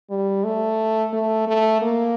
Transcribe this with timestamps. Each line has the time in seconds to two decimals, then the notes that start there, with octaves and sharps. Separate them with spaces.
0.10 G3
0.44 A3
1.13 A3
1.47 A3
1.81 A#3